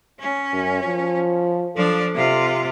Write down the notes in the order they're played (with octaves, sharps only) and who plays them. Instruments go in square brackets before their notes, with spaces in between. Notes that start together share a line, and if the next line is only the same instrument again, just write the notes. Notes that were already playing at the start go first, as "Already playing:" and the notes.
[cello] C#4
[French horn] F#2
F3
[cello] F3 D4 [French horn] A4
[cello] C3 F4